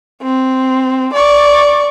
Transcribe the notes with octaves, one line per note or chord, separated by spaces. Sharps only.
C4
D5 C#6